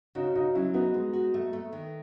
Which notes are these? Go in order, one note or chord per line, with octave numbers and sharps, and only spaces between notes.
C#3 D#4 F#4
C#3 D#4 F#4
F#3 C#4 E4
B3 D#4 F#4
G#3
F#4
A3
A3
D#3